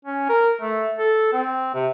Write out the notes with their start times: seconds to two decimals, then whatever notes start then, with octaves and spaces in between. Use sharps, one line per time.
0.05 C#4
0.29 A#4
0.61 A3
0.98 A4
1.33 C4
1.74 C3